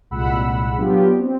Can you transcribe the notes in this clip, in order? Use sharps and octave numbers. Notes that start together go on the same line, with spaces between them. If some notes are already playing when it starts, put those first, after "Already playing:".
C2 A#2 G#3 F#5 B5 E6
F#3 B3 D4 F4 G4
C4